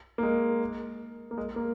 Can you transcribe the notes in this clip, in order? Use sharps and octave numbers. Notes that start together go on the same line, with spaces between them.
A#3
G#3
A#3
G#3
A#3